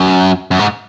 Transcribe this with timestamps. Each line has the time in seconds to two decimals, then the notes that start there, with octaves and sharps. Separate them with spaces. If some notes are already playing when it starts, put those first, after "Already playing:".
Already playing: F#2
0.51 F#2
0.59 G#2